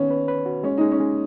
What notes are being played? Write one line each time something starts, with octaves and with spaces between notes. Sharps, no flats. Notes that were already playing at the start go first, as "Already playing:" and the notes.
Already playing: D#3 B3 C#4
B4
B4
F#4
G#3 C#4
G#3 D#4
C#4
G#3